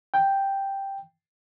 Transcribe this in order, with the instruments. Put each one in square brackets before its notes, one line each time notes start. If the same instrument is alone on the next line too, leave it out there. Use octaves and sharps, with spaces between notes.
[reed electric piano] G5